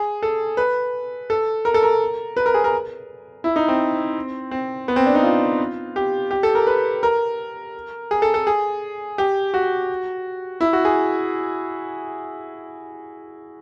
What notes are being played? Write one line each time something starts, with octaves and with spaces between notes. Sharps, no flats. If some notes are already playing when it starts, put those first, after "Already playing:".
Already playing: G#4
A4
B4
A4
A#4
A4
A#4
B4
A#4
G#4
A#4
E4
D#4
C4
C4
B3
C4
D4
D#4
F4
G4
G4
A4
A#4
B4
A#4
G#4
A4
A4
G#4
G4
F#4
E4
F#4
G#4